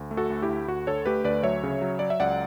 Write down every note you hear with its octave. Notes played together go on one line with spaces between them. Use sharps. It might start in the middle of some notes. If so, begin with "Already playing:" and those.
Already playing: D2
A3
F#4 A4
D2
E4 G4
D2
D2 F#4
D3 A4 C#5
A3 G4 B4
D2 B4 D5
F#3 C#5 E5
C#3
F#3
F#3 D5
E5
C#2 D5 F#5